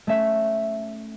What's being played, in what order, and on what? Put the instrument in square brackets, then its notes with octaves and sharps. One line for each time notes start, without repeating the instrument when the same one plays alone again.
[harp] A3 C#4 E5